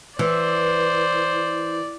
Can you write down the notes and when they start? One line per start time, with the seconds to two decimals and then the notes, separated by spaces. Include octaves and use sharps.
0.19 E3 C5 D5